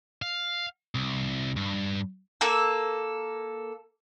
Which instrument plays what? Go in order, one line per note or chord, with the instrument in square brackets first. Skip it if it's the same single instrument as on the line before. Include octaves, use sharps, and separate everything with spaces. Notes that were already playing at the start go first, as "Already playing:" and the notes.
[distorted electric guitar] F5
C2
G2
[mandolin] A#3 A4 E6